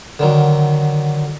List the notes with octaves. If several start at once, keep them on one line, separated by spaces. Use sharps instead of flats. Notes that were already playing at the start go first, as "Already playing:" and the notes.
D3 D#3 F#3